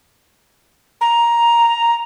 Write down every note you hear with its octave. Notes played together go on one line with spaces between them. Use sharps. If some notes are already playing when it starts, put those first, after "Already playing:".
A#5